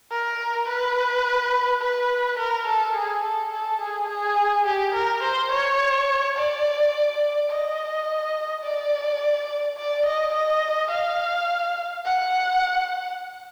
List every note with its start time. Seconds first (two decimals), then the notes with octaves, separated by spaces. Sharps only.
0.11 A#4
0.68 B4
1.82 B4
2.39 A#4
2.67 A4
2.95 G#4
3.23 A4
3.52 A4
3.81 G#4
4.09 G#4
4.66 G4
4.94 A#4
5.23 C5
5.51 C#5
6.36 D5
7.50 D#5
8.63 D5
9.77 D5
10.06 D#5
10.34 D#5
10.91 F5
12.05 F#5